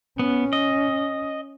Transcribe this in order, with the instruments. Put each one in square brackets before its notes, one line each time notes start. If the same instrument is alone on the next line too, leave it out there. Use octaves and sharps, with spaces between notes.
[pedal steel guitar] B3 [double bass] C#4
[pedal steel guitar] D#5